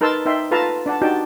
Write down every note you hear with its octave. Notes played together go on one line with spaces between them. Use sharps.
D#4 A#4 B4 A5 C6 E6
D#4 C5 E5 G5 C6
F4 A4 B4 F5 A5 A#5
D4 D5 F#5 A5
D4 D#4 F#4 G4 G5 A5